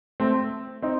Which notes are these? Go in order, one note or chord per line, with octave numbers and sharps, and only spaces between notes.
A3 C4
C4 D#4